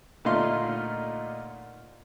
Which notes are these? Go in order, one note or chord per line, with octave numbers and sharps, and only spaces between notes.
A#2 D3 A3 D#4 F4 C6